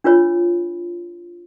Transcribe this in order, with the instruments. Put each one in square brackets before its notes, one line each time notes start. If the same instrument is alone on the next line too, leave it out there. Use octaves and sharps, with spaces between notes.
[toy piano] D4 F4 B4 C#5 B5